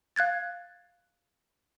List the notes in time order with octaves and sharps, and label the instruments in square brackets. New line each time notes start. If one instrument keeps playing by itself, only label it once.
[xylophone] F5 F#6 G#6 A6